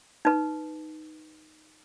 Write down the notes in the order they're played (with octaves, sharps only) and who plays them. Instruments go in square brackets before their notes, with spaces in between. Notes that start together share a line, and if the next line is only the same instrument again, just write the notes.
[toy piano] D#4 B4